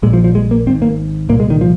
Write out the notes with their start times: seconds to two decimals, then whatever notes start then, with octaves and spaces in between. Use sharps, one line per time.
0.02 A#1 A#2 G#3
0.13 F3
0.24 F3
0.35 G#3
0.51 A#3
0.66 G#1 G#2 C4
0.82 A#3
1.29 C2 A#2 A#3
1.40 G#3
1.50 D#3
1.61 F3